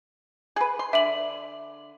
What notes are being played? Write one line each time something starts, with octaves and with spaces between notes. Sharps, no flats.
G#4 B4
C6
D3 E5 F#7